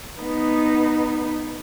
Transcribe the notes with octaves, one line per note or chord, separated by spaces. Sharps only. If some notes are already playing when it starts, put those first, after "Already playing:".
B3 D#4